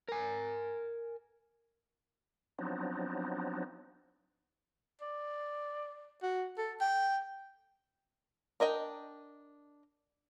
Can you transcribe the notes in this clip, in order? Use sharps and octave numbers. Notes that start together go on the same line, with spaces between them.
A#4 G#5
F3 F#3 B3 C4 D4 D#4
D5
F#4
A4
G5
D4 A#4 D#5 G5